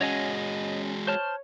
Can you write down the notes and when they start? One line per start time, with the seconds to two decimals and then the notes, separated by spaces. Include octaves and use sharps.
0.01 G#3 C#4 F#4 C#5 D#5 G#5
1.07 C5 C#5 A5 F6